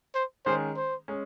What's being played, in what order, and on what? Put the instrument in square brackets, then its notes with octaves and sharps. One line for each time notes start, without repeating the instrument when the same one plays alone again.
[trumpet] C5
[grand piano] D#3 G#3 C#4 G#4 [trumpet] C5
[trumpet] C5
[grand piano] G#3 C#4